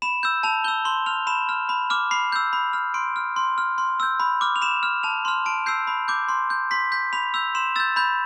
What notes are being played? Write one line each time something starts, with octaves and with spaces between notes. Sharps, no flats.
B5 E7
E6 G6
A5 F7
E6 G6 G7
C6 G7
F6 F7
B5 E7
F6
B5
D6 F6
B5 C7
E6 G6
B5
F6
C6 D7
F6
C6
F6
C6
E6 G6
B5
D6 F6
F7
B5 E7
F6
A5 F7
C6 F6
A5 D7
E6 G6 C7
B5
D6 G6
C6
G6
C6 B6
G6 B6
B5 F7
E6 G6 F7
C6 E7
E6 G6 A6
B5 G6